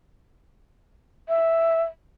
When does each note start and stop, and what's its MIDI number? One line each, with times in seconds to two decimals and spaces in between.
1.29 1.83 76